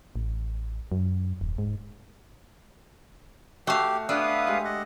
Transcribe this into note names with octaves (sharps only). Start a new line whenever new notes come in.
A1
F#2
D#1
G#2
A3 F#4 G4 F5
B3 D4 B4 E5 F5 G5 D#6
G#3 G4
D#5 F#5